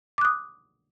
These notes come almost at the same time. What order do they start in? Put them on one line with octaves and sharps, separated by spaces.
D6 F#6 D#6